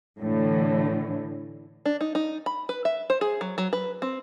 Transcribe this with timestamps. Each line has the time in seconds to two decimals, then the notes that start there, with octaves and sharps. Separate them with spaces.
0.19 A2 D3 E3
1.86 D4
2.01 D#4
2.15 D#4
2.46 B5
2.69 B4
2.85 E5
3.10 C5
3.21 G#4
3.41 F#3
3.58 F#3
3.73 B4
4.02 C4